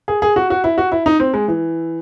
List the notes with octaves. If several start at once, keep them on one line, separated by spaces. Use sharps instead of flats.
G#4
G#4
F#4
F#4
E4
F#4
E4
D#4
C4
G#3
E3